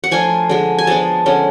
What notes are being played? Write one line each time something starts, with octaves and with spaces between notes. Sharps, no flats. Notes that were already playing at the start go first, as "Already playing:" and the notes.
F#5
F3 A3 D4 F4 G#5
D3 G#3 D4
G#5
F3 G#3 B3 D4 A5
D3 G#3 C#4